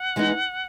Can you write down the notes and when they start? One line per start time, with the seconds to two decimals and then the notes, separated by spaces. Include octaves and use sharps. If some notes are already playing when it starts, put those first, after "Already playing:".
Already playing: F#5
0.16 E3 G#3 B3 D#4